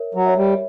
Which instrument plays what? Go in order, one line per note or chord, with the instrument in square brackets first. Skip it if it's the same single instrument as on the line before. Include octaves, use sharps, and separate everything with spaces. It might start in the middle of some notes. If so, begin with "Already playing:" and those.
Already playing: [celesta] A#4 C#5 E5
[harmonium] F#3
[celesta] C#5 E5
[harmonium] G3